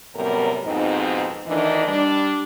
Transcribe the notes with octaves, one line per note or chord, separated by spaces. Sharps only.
F#2 A2 C3 G3 B3 A#4
F2 G#2 B2 C4 D#4
D2 D#3 E3 D4 D#4 D#5
G3 D4